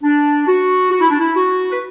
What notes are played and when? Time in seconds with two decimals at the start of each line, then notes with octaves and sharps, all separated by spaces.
0.04 D4
0.47 F#4
0.92 F#4
1.01 E4
1.11 D4
1.20 E4
1.36 F#4
1.72 B4